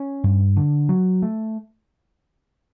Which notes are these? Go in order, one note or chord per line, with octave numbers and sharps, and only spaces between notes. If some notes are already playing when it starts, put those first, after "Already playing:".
Already playing: C#4
G2
D3
F#3
A3